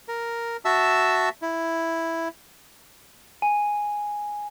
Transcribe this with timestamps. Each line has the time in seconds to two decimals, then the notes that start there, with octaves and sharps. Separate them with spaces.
0.08 A#4
0.65 F#4 E5 A5 E6
1.42 E4
3.42 G#5